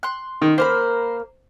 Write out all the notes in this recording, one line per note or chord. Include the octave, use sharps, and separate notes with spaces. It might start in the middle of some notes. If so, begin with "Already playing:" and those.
C6 F#6
D#3
A#3 A#4 C5 B5